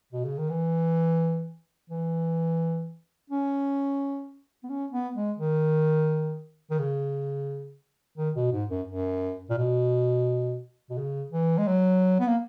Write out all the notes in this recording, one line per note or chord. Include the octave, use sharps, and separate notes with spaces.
B2
C#3
D#3
E3
E3
C#4
B3
C#4
B3
G#3
D#3
D#3
C#3
D#3
B2
G#2
F#2
F#2
A#2
B2
B2
C#3
E3
G#3
F#3
B3
A#3